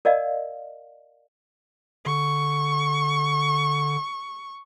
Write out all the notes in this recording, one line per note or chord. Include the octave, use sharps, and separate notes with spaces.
A#4 D5 D#5 F5
D3 C#6